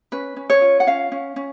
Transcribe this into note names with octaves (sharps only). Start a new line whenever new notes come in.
C#4 B4
C#4
C#5
F4
F#5
C#4 F5
C#4
C#4